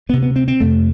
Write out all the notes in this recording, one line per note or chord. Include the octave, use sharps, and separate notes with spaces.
D2 C3 B3
B3
C4
C4
F2 C3 A3